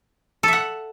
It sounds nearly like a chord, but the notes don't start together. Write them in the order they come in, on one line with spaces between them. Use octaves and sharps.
A4 E5 F#5